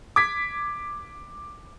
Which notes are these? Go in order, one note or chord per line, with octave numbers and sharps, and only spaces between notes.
D6 G#6 B6